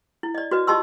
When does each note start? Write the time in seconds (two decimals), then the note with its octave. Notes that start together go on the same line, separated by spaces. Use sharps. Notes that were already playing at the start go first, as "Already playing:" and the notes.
0.23 E4
0.35 D5 D#5
0.51 F#4 B4 D#5
0.67 F4 G4 D#5 A5 C6 E6